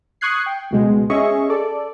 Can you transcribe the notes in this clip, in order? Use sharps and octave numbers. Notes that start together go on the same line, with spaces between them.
C#6 D#6 F#6 G#6 C7
G5
C#2 B2 G#3
C#4 G#4 D#5 E5 C#6
A4 D5